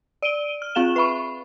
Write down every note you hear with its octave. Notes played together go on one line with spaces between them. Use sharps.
D5 D7 D#7 G7
F6
C4 F4 G#4 F5 E7 G7
B4 E5 B5 C#6